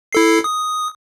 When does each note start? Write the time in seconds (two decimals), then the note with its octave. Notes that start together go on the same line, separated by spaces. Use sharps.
0.13 E4 A4 C7
0.44 D#6